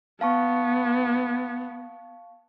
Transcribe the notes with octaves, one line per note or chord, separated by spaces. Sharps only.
B3 F5 A5 C#6